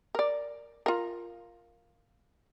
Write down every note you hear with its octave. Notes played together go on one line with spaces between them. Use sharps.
A#4 D5
F4 A#4